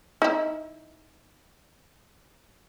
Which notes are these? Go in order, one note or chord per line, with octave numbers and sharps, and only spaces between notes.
D#4 E4